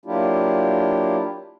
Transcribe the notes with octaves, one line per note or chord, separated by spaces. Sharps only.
F#3 A#3 D4 E4 F4 G4